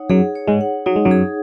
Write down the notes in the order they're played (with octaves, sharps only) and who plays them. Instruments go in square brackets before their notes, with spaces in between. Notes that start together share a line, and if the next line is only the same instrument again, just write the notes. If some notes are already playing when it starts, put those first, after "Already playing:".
Already playing: [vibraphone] D#4 C#5 F#5
[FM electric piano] F#2 F#3 [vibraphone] G#4
[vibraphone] C#5
[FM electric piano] G#2 G#3
[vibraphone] F#5
[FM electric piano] F#3 [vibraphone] D#4
[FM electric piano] G#3
F#2 F#3
[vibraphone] G#4